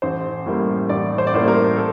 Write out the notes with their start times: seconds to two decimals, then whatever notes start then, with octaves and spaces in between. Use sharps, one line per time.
0.02 A1 C5
0.46 A2 G3 A#3
0.89 A1 D5
1.18 C5
1.27 D5
1.34 A2 G3 A#3 C5
1.48 A#4
1.77 A4